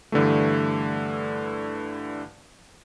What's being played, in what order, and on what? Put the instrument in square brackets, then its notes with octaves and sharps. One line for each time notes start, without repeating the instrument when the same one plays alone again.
[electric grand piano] G2 D3 E3 A3